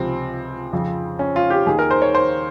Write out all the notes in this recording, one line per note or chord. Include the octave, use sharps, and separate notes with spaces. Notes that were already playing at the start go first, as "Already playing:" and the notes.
Already playing: C#2 C3 F3 C4
F2 C#3 F3
C#4
F4
G4
D#2 D#3 G#4
A#4
C5
C#5
C5